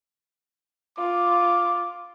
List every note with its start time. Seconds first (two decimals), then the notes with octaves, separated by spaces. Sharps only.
0.99 F4 D6